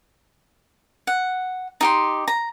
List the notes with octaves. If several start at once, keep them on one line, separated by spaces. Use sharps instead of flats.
F#5
D#4 G4 C6
A#5